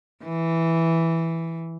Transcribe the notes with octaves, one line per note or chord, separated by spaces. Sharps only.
E3